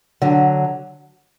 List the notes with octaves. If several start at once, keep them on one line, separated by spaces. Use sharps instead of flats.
D3 F#3